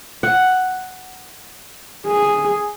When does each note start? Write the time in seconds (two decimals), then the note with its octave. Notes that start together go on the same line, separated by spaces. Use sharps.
0.23 F#5
2.07 G#4